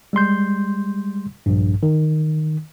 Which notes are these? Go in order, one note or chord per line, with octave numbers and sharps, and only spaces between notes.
G3 G#3 C6 G6
A#1 G2
D#3